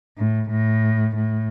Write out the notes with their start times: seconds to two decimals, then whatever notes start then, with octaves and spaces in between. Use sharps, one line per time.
0.18 A2
0.51 A2
1.16 A2